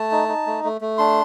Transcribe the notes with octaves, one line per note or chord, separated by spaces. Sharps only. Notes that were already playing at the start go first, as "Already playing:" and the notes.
Already playing: A3 A5
D#4
D#4
A3
A3
A3
D4 C6